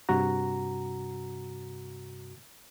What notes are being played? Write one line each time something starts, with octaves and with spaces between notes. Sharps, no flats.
G2 C3 F#4 A#5